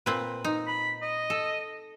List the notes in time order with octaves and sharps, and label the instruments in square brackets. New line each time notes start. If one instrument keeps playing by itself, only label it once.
[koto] A#2 C4 B4
D#4
[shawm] B5
D#5
[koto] A4